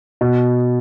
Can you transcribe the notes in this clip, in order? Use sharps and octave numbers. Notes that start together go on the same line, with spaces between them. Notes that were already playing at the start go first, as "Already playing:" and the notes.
B2